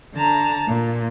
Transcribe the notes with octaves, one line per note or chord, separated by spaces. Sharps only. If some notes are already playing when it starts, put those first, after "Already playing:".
D3 A5 A#5
A#2